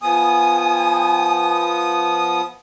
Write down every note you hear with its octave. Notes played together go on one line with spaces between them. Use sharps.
F3 B3 G#5 D#6